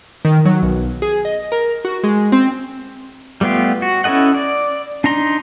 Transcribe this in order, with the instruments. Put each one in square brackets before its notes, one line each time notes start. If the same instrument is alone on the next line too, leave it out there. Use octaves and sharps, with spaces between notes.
[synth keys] D#3
F#3
B1
G#4
D#5
A#4
F#4
G#3
C4
[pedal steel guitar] G3 A3 B3 F4 G4
F#4
C#4 E4 A4 D#5 F#5
D5
D4 D#4 A#5 C6